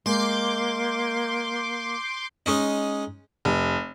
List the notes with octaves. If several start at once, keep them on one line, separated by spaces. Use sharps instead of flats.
G#3 A#3 C6 D6 G6
G#3 C#4 D#4
F1